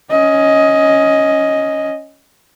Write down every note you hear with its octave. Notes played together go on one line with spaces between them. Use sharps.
C#4 D#5